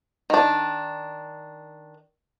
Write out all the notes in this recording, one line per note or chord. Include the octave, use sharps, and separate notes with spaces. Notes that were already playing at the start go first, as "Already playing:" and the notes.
D#3 D4